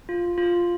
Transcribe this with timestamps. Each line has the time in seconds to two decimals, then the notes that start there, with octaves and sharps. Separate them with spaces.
0.09 F4
0.38 F4